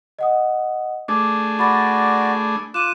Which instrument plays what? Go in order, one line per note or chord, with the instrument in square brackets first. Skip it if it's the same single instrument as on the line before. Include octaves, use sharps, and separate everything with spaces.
[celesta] D#5 F#5 D#6
[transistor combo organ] A3 D4 G#4 [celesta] D6
[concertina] F#4 D5 [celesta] B5 A6
[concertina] F4 D6 F#6 [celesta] D#7 E7